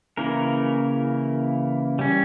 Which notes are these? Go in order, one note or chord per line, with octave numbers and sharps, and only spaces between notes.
C#3 E3 A#3 A#4
G3 C#4